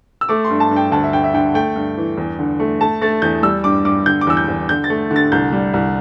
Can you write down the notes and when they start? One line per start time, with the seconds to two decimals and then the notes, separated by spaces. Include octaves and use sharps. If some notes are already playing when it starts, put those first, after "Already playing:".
0.21 E6
0.29 A3 D6
0.45 C6
0.51 G2
0.60 A5
0.71 G2
0.76 G5
0.92 D2 A5
1.03 E5
1.13 D2 G5
1.24 E5
1.34 D3 G5
1.54 A3 G5
1.76 G2
1.97 E3
2.18 E2
2.39 D3
2.60 A3
2.81 A3 A5
3.02 A3 A6
3.22 E2 G6
3.43 G3 E6
3.64 G2 D6
3.85 G2 D6
4.06 D3 G6
4.21 D6
4.27 E2 E6
4.37 G6
4.48 E2
4.69 D3 G6
4.84 A6
4.90 A3
5.11 D3
5.16 A6
5.32 C2 G6
5.52 G3
5.73 C2